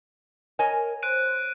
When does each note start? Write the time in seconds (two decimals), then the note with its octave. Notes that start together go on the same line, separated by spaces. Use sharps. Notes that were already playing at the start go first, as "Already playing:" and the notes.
0.59 A#4 C#5 D#5 G#5
1.03 C5 F#6 D7 D#7